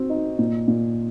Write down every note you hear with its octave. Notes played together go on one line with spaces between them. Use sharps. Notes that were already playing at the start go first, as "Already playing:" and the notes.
Already playing: C4 F#4
D#4
A#2
A#2